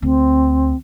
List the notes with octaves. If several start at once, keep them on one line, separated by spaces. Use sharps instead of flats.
D2 C4